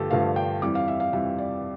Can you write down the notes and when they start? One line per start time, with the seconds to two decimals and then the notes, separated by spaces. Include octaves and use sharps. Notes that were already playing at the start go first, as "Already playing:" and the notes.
Already playing: G2 D3 F3 A3 G4 A4
0.11 G2 D3 F3 A3 F5
0.36 G5
0.62 F2 E3 G3 D6
0.75 F5
0.88 E5
1.00 F5
1.13 F2 E3 G3 E5
1.38 D5